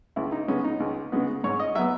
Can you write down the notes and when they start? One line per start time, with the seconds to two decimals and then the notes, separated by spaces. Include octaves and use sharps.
0.16 C#2 E4
0.32 D#4
0.48 C#3 G#3 B3 C#4
0.64 D#4
0.80 C#2
1.12 C#3 G#3 B3
1.44 G#2 C#5
1.60 D#5
1.75 F#3 B3 E5